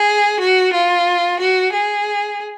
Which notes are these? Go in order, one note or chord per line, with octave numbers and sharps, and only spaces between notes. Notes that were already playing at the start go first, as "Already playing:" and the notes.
Already playing: G#4
F#4
F4
F#4
G#4